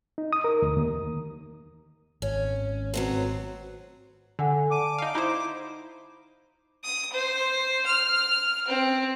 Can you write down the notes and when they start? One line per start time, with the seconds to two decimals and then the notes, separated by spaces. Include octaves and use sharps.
0.18 D#4
0.33 D#6
0.44 A#4
0.62 D2
0.77 D#2
2.22 G#1 C#4
2.94 F#3 B3 C4
4.39 D3 A4 F#5 G#5
4.71 D5 A5 D6 D#7
4.98 D#4 F5
5.15 D#4 E4 C5 B5
6.84 D#6
7.13 C5
7.86 F6
8.68 C4